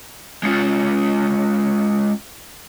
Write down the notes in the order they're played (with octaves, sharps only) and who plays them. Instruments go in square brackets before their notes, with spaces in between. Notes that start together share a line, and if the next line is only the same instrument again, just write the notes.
[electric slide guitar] G#3 C#4 F4